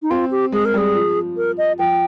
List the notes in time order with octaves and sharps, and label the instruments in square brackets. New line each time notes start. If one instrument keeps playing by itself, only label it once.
[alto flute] D#4
[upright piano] C4 [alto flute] F4
[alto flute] G4
[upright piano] G#3 [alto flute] G#4
[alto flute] A#4
[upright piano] G3 [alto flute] G#4
[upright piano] F3
[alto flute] A#4
D#5
[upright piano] F3 [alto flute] G5